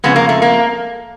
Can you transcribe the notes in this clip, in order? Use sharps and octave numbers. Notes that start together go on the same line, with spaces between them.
F2 C#3 G#3 B3
A#3
A3
A#3